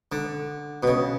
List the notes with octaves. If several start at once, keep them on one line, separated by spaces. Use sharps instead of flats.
D3
B2
C#3